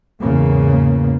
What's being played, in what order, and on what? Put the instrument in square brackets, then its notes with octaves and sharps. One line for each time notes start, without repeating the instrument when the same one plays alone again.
[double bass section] E2 G#2 C#3 A#3